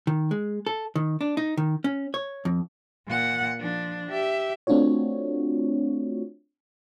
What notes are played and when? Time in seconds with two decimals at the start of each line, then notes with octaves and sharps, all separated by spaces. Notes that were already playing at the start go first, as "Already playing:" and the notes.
0.07 D#3
0.31 G#3
0.67 A4
0.95 D#3
1.21 D4
1.37 D#4
1.57 D#3
1.84 C#4
2.14 C#5
2.45 F2
3.08 A#2 F#5
3.60 F3 D4
4.10 G4 E5
4.67 A3 C4 D4 F4 F#4 C#5